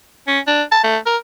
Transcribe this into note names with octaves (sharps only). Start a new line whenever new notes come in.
C#4
D4
A5
A3
A#4